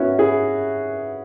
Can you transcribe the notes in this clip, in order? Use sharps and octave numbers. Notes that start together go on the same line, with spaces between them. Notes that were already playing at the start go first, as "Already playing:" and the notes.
Already playing: B3 C#4 E4 F#4
E4 G#4